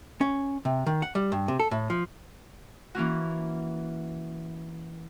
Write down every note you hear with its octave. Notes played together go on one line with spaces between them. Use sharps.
C#4
C3
D#3
F#5
G3
G2
C3
A4
A2
F3
E3 A#3 C#4 F#4